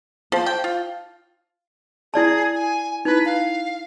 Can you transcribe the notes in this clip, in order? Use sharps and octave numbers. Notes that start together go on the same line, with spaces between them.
F3 C5 A5
G5
F4
E4 G#4 D5 A5
G#5
D#4 E4 B4
F5